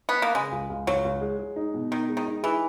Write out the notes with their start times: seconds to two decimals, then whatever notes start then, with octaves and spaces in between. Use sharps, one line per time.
0.09 B3
0.22 A#3
0.35 C#3 G#3
0.52 C#2
0.70 C#2
0.87 C#2 F#3
1.05 C#2
1.22 G#3
1.39 G#3
1.56 D#4
1.74 B2
1.91 D#3 D#4
2.09 G#3
2.17 D#3
2.26 D#4
2.43 E3 G#4